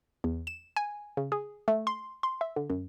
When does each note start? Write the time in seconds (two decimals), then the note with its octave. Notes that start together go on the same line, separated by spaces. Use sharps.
0.24 E2
0.47 E7
0.76 G#5
1.17 C#3
1.32 G#4
1.68 A3
1.87 C6
2.23 C6
2.41 E5
2.56 D3
2.70 F#2